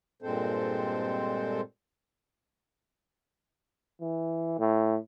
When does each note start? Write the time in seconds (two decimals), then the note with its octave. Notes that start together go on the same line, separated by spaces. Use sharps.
0.22 G2 A#2 G#3 C4 A4 C5
4.01 E3
4.59 A2